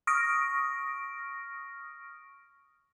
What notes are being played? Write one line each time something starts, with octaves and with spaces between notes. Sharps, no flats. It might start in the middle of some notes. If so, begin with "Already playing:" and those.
C#6 D#6 F6 A#6 D7